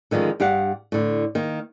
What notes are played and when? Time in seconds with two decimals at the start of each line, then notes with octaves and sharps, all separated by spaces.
0.11 D3 D#3 F3 G#3 C#4
0.40 G2 G4 F5 F#5
0.92 A2 D3
1.35 D#3 A#3